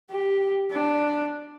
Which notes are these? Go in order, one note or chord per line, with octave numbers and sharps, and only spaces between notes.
G4
D4